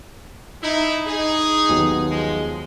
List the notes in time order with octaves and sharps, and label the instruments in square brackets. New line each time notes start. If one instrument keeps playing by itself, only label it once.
[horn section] D#4 E4
D#4 G#4
[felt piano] D#2 F#3 B3
[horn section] F3 G#3